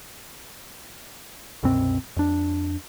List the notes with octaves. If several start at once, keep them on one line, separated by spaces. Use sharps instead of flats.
C2 F#2 B2 C4
F2 D4